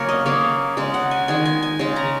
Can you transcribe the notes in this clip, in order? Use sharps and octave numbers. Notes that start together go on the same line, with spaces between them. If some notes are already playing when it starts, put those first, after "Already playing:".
Already playing: C#3 F#3 A#3 A#4 C#5
D#5
C#3 A#3 C#5
C#3 G#3
F#5
G#5
D#3 G#3 G#5
G#5
G#5
C#3 G#3
A#5